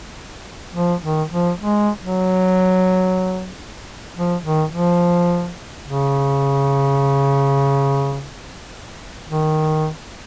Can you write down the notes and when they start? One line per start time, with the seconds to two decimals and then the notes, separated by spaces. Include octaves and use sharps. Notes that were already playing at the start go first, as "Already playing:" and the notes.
0.74 F3
1.03 D#3
1.31 F3
1.60 G#3
2.02 F#3
4.16 F3
4.44 D#3
4.72 F3
5.86 C#3
9.28 D#3